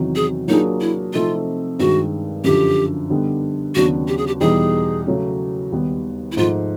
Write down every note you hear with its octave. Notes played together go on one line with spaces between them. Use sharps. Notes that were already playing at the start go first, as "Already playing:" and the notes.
Already playing: E2 C3 D#3 F#3
G#4
F#3 A#3 D4 D#4 F4 G#4
E4
C3 F3 A3 C4 D#4 F4
G2 D#3 G#3 F#4
F#2 D3 F3 G4
D3 G3 B3 D#4 G4
D#2 C#3 F#3 B3 D4 F#4
G4
G#4
G4
E2 B2 G3 B3 D#4 G#4
C#3 F#3 A3 C#4
D#2 D#3 G3 B3
E4
G#2 F3 A3 F4